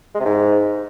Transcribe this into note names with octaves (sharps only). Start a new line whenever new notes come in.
G#3
C3
G#2